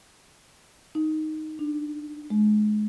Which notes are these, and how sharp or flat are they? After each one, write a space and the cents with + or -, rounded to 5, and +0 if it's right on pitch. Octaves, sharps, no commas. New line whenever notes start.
D#4 +0
D4 +20
G#3 +30